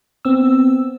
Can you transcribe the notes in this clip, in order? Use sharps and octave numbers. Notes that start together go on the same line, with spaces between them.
B3 C4 E6